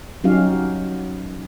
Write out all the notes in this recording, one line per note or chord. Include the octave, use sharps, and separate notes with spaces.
F#3 C#4 D#4 F#4 G4 F5